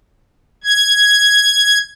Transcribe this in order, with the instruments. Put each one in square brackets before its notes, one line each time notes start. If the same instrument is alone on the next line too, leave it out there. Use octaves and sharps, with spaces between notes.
[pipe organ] G#6